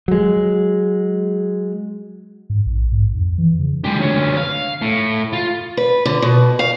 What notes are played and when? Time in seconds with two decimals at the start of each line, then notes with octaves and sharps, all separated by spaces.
0.08 F#3 G#3
2.50 G#2
2.66 A#1
2.92 G#2
3.16 F2
3.38 E3
3.60 C#3
3.84 G#3 G4
3.98 D2 C#4
4.37 F5
4.82 A2
5.33 F4
5.77 B4
6.05 D3
6.22 B2
6.59 F5